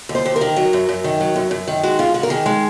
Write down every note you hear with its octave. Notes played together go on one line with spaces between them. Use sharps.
D#2
C5
D#2
A#4
D#3
F#3
F#2
F#2
D#3
F#3
F#2
F#2
D#3
G#3 F#4
G#2 F4
G#2 F#4
A#4
D#3 G#4
G#3